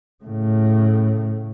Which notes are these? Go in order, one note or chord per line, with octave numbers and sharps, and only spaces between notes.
A2 C#3